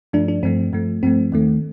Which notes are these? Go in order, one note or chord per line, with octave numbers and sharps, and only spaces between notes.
G2 F3 A3 D4
D4
G2 F3 A3 C4
G2 F3 A3
G2 F3 A3 C4
D#2 D#3 A3